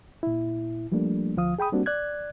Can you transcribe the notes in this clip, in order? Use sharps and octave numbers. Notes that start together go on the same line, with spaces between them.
A#2 E4
F3 G3 A3 A#3 D4
D2 F3 F5 D#6
G#4 G5 B5 D#6
G3 A#3 C4 D4 F#4
D5 F#6 G#6